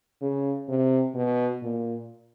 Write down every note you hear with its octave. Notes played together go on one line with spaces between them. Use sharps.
C#3
C3
B2
A#2